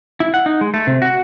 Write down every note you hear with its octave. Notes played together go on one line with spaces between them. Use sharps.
E4
F#5
D#4
G#3
A3
C3
F#4